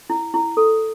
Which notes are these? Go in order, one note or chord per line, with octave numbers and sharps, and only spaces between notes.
E4
E4
A4